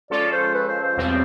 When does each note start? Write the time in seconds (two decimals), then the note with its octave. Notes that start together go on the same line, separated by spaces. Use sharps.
0.10 F3 G#3 C#4 F4 A4 D5
0.33 C5
0.54 B4
0.68 C5
0.83 C5
0.97 E2 B2 G3 C4